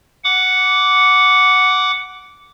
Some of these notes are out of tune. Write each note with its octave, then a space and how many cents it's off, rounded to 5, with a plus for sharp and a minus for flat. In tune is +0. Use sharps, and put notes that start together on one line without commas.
F#5 +0 D6 -15